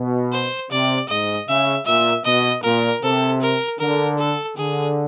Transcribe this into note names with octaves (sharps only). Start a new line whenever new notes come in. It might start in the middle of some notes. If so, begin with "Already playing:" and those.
Already playing: B2
C5
C3 D5
G#2 D#5
C#3 E5
A#2 E5
B2 D#5
A#2 A#4
C3 A4
A#4
D3 A#4
A4
D3 G#4